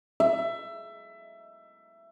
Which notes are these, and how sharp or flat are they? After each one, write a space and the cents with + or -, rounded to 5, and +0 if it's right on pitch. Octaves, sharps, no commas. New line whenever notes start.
E5 +20